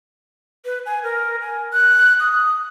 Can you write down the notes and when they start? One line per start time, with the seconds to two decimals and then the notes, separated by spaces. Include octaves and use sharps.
0.65 B4
0.86 G#5
1.03 A#4
1.41 G#5
1.73 F#6
2.20 D#6